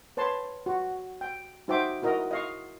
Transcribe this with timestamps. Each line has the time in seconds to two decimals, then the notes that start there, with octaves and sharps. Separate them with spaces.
0.17 B4 C#5 A5 C6
0.66 F#4
1.21 G5
1.68 D#4 F#4 C5 E5 G5 D6
2.02 E4 F#4 A#4 D#5
2.31 D#5 F5 C#6